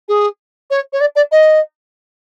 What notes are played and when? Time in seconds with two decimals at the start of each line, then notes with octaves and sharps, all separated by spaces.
0.09 G#4
0.71 C#5
0.93 C#5
1.01 D5
1.16 D5
1.32 D#5